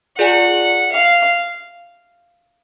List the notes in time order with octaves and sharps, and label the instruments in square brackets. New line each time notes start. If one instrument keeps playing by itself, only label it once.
[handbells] F4 G#4 D5 G#5 [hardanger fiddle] F#5
[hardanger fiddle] F5